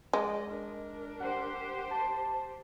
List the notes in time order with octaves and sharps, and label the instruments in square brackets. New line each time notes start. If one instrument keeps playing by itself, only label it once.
[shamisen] G#3 [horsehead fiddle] D5 D#5
[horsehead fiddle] D4 A#4
[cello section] G4 C5 [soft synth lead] F#5
[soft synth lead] A5